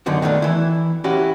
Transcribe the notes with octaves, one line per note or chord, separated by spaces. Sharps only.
F#2 D3 D#3 F#4
D#3 A3 B3 C4 D4
E3 E4
C#4 E4 F#4 G4